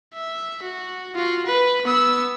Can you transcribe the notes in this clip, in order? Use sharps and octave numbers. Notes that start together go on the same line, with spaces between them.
E5
F#4
F4 F#4
B4
B3 E6